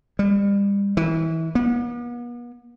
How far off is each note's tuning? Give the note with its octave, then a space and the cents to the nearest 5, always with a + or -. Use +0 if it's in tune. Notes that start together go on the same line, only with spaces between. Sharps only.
G3 +35
E3 -25
B3 -45